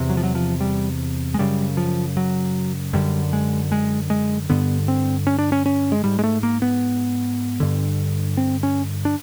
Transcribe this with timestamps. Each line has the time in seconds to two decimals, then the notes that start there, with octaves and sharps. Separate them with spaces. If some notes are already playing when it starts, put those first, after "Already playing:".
Already playing: E2 C3
0.09 F#3
0.17 F3
0.23 F#3
0.35 F3
0.60 G3
1.34 G#3
1.38 F#2 C#3 G3
1.77 F3
2.17 F#3
2.93 F#2 D3 G3
3.33 G#3
3.72 G#3
4.10 G#3
4.49 G2 D3 B3
4.88 C4
5.27 C#4
5.39 D4
5.52 C#4
5.66 C#4
5.92 G#3
6.04 G#2 G3
6.19 G#3
6.24 A3
6.43 A#3
6.62 B3
7.60 G2 D3
8.37 C4
8.63 C#4
9.05 D4